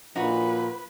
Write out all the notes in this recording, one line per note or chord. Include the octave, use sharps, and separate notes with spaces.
A#2 F3 D#4 F#4 B4